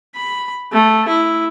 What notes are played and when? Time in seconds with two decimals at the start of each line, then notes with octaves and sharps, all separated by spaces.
0.15 B5
0.72 A3
1.08 E4